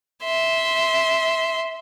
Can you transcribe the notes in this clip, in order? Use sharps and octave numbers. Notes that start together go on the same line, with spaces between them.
E5 C6